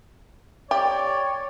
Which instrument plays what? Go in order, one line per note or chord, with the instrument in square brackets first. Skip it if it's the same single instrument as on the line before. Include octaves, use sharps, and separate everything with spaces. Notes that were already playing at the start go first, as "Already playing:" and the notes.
[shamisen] G4 [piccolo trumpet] C#5 [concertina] D5